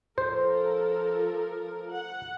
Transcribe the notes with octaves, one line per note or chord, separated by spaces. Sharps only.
F3 A4 A#4 C5
F#5